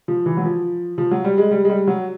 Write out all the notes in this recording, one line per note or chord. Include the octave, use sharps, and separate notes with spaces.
F3
E3
F#3
F3
F3
F#3
G3
G#3
G3
G#3
G3
F#3